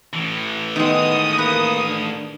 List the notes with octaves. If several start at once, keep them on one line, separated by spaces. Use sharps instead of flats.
A2 E3
D#3 G#3 B3 D#6
A#3 B4
D4